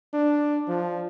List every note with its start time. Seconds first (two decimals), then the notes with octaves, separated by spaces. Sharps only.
0.14 D4
0.68 F3